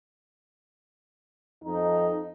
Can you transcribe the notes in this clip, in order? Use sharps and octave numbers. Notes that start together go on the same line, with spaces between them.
F2 D#4